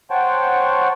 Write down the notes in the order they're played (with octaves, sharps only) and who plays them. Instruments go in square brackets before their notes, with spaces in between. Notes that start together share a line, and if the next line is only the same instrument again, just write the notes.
[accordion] C5 C#5 F#5 G5 A5 C#6